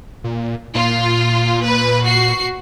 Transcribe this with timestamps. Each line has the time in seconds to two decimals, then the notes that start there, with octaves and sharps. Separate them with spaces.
0.24 A#2
0.75 A#2 F4
1.64 B4
2.05 F#4 C7